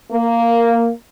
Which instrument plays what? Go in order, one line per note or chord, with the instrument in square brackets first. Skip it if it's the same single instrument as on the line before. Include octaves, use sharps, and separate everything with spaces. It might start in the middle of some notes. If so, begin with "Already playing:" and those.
[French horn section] A#3